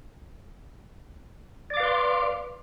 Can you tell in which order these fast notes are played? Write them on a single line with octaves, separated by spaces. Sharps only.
D5 D6 F5 B4 C6